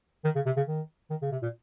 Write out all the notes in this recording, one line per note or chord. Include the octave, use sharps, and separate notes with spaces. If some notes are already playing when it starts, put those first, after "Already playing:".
D#3
C#3
C3
C#3
D#3
D#3
C#3
C3
A#2